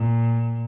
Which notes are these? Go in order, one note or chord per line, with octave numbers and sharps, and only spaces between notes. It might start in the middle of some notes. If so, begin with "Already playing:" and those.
Already playing: A#2